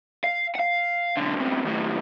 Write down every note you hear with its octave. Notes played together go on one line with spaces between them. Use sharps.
F5
F5 F#5
B1 D3
D2 C3
D#2 A2